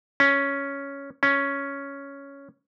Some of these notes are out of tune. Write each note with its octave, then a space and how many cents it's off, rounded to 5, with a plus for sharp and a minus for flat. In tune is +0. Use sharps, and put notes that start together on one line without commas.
C#4 +5
C#4 +5